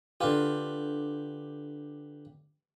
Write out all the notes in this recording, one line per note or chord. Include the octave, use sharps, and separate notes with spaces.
D3 F4 G4 B4